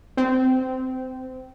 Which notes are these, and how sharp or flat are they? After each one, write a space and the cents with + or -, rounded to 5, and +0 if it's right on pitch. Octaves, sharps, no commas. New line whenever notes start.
C4 -15